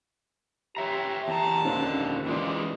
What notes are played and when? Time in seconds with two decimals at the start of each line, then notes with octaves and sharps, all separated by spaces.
0.77 G4 C#5 E5 A#5
1.28 E2 A5 A#5
1.65 D#2 A#2 D3 C#4 D#4 C5
2.27 E3 G#3 F4 D5